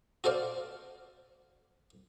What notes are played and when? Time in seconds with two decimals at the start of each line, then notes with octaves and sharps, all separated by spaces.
0.24 F#4 A4 C5 D5 F5